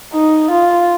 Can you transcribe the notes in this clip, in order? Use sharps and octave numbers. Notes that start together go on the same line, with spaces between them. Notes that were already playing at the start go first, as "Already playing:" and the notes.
D#4
F4